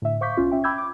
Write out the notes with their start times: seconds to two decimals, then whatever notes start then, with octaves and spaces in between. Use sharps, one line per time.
0.02 A2 D3 E5
0.21 C5 F5 C#6 D6 G6 B6
0.37 B1 C#4 F4
0.51 C#4 E5 G5
0.64 G5 B5 D6 E6 G6 G#6
0.78 D6